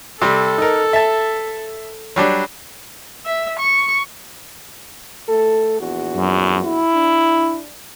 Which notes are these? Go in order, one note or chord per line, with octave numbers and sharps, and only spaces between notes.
C3 G3 A4
D#4 A#4
E5 A5
F#3 G3 D4
E5
C#6
A3 A4
A#1 E2 F#4
F#2
E4
D4